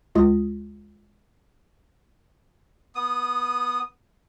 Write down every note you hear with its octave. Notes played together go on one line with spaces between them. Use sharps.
D2 G#3 F4 D#6 A#6
B3 D#6